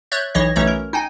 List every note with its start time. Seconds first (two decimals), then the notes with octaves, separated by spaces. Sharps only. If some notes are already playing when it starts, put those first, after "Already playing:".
0.12 C#5 E5 F#6 G6 A6
0.35 B1 E3 C#5 D#5 A#6
0.56 B1 E3 A3 C#4 C#5 A#5
0.67 A#4
0.93 D#4 G5 G#5